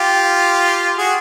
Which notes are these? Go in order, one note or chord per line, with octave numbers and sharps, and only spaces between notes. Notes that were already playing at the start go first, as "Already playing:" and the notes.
Already playing: F4 G4
F#4 G#4